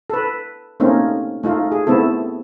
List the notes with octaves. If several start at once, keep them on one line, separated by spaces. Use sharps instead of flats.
A4 B4
A3 A#3 C4 C#4 D#4
A3 D#4 F4
G#4
A3 B3 C4 E4 A4